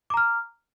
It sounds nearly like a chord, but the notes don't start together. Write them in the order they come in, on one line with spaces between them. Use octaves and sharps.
D6 A#5 F6